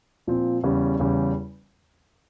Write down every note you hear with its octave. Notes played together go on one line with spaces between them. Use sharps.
A#2 F3 C4 F4
E2 C#3 G3 C#4
E2 C#3 G3 C#4